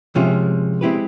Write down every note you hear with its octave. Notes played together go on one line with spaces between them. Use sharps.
C3 F3 G#3 C#4 F4
G#3 C4 E4 G4 B4